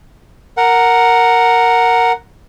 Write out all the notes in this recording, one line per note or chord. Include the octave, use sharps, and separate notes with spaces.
A#4 F#5